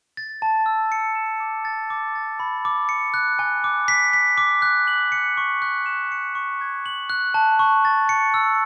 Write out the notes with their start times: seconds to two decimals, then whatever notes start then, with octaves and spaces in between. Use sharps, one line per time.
0.17 A6
0.42 A5
0.66 E6
0.92 C#7
1.15 E7
1.40 D6
1.65 A6
1.90 D6
2.15 A6
2.40 B5
2.65 D6
2.89 C#7
3.14 F#6
3.39 G#5
3.64 D6
3.88 B6
4.13 B6
4.38 D6
4.62 F#6
4.88 F#7
5.12 C#7
5.37 C#6
5.62 F#6
5.86 E7
6.12 C#7
6.35 C#6
6.61 G#6
6.86 F#7
7.10 F#6
7.34 A5
7.59 C#6
7.85 A6
8.09 C#7
8.34 E6